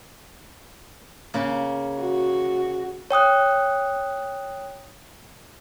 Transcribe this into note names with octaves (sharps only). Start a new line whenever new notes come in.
C#3 A#3
F#4
C#5 G5 D#6 F#6